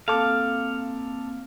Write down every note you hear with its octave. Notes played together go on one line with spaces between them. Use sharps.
A#3 C4 A4 F5 A5 D6